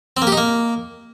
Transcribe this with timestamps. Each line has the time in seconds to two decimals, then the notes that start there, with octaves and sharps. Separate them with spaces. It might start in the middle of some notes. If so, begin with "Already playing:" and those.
0.17 C4
0.22 A#3
0.27 G4
0.32 D#4
0.37 A#3